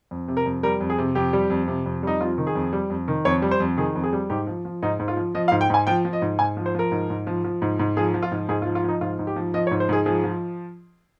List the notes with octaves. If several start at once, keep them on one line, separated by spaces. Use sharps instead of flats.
F2
C3
A#4
F2
G3 A#4
F2
G#4
C3
F2 G4
G3
F2
C3
F2
G3 D#4
F2 F4
D#3
G#4
F2
G3
F2
D#3
F2 C#5
G3
C5
F2
D#3 G#4
F2
G#4
G3
G#2 G4
F3
F3
G#2 D#4
G#2
F4
F3
F3 D#5
F5
G#2
G5
G#2 G#5
F3 G5
F3
D#5
G#2
G#2 G#5
F3
C5
F3 A#4
G#2
G#2
F3
F3
G#2
G#2
F3 G#4
F3
F4
G#2
G#2 G#4
F4
F3
F4
F3 D#4
G#2 F4
G#2
G4
F3
F3 D#5
C#5
G#2
C5
G#2 G#4
F3 G#4
F3